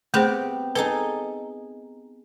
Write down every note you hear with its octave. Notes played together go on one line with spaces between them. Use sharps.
A3 B3 C4 G4 G#4 C5
D#4 G#4 A4 B4